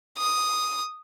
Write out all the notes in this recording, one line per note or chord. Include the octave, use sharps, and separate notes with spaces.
D#6